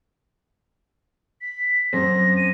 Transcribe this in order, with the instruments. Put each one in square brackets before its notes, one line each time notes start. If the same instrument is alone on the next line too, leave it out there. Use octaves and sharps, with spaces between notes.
[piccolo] B6
[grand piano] F#2 C4 [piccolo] A#6
[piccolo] D#7